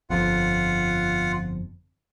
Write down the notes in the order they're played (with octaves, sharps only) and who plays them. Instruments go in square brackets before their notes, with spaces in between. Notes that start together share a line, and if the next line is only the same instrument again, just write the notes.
[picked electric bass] G1 F2 [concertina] F4 F#5